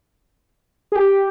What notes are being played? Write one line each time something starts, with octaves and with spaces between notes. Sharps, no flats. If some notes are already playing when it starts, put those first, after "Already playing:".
G#4
G4